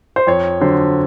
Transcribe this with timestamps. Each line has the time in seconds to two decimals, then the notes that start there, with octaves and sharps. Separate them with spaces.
0.16 C5
0.27 F2 C#5
0.60 D3 F#3 C5